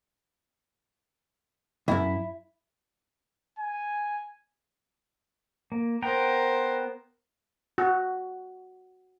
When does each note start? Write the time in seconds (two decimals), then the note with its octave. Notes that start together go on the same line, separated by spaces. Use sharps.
1.88 C#2 F#2 E4
3.59 G#5
5.72 A#3
6.02 B3 A#4 C5 G5 A#5
7.78 F#4